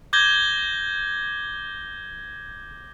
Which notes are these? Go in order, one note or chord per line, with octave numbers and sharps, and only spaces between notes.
D6 G6 G#6 A#6 G7